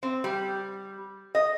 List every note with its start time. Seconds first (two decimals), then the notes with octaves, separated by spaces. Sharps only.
0.03 C4
0.24 G3
1.35 D#5